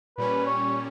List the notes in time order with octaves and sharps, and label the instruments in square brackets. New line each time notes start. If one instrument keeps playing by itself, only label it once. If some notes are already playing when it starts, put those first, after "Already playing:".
[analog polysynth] A#2 G3 C#4 [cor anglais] B4
[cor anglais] C#5